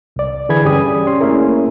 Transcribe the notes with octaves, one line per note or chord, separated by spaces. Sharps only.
C2 D5
D3 E3 G#4 B5 G#6
G2 C#4 G4 G#4 D5 D#6
C#4 C6
A3 A#3 C#4 E4 G#4 A#4